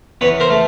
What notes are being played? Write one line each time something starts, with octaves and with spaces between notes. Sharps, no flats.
E2 B4 C#5
A#4 C5
A3